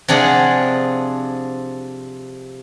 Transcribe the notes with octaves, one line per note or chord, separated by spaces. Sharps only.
C3 F3 D4 G#4 F#5